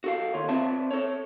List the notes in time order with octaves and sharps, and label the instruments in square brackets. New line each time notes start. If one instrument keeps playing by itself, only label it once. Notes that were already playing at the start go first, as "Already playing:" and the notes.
[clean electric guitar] F#4 A4 F5
D#2 F4 C#5
C4 B4 D5 E5 A5
A4 C#5